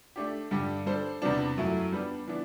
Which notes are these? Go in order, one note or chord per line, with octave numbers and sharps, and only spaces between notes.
A3 D4 G4
G2 D3 G3 D4 G4
G3 D4 A4 C5
E2 C3 G3 B3 D4
F#2 F#3 A3 E4
G3 B3 D4
E3 B3 D4